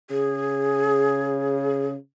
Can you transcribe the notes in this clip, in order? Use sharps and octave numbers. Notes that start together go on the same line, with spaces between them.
C#3 G#4